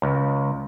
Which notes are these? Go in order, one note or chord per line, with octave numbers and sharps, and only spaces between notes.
C#2